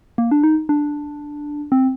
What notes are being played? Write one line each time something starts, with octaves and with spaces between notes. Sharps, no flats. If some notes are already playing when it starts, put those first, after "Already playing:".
A#3
D4
D#4
D4
C4